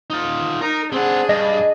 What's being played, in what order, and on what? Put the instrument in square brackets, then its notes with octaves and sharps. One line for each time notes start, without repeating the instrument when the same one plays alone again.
[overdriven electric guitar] D#4 F4
[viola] D#4 [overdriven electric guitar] A#4
[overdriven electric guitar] C4 F#5 [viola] D4 G#4
[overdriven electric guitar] G2 [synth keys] D#5